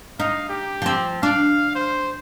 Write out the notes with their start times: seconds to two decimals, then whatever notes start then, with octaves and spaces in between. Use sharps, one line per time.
0.19 D#4 F5
0.49 G4
0.82 F3 C4
1.23 D4 F5
1.75 C5